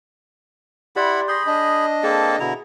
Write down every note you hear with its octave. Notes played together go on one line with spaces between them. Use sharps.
E4 G4 D5 F#5 B5 C6
G#4 B5 C6 G6 A#6
D4 D#5
A#3 C4 G#4 A4
B2 D3 E4 A#5